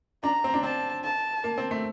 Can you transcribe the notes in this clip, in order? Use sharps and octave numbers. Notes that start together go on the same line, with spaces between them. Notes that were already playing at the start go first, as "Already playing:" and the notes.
D4 A#5
C4
D4
C4 A5
A5
A#3
C4
A3